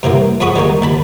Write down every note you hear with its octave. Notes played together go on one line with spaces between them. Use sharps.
G2 C3 E3 A#3
F2 G#2 F#4 B5 C#6 D#6
G3 G#3 A#3 D#4
D#2 A5 B5